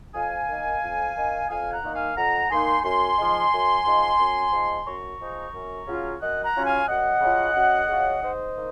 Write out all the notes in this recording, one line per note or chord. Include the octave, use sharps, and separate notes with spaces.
F2 F5 G#5
D#3 A#3 D#4
F2
D#3 A#3 D#4
F2 F5 G#5
F#5 A#5
D#3 A#3 D#4
F5 G#5
F2 F#5 A#5
D#3 A#3 D#4 G#5 C6
F#2 G#5 C6
F3 G#3 D#4
F#2
F3 G#3 D#4
F#2
F3 G#3 D#4
F#2 A#5 C#6
F3 G#3 D#4
F#2
C#3 F#3 C#4 F4
F#2 D#5 F#5
F#5 A#5
C#3 F#3 C#4 F4
F5 G#5
F#2 D#5 F#5
C#3 F#3 C#4 F4
F#2
C#3 F#3 C#4 F4
G#2 C5 D#5
D#3 A#3